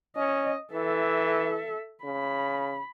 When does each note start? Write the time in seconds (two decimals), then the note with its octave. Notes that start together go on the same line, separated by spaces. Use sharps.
0.16 C#4 D#5
0.73 E3 A4 E5
2.04 C#3 B5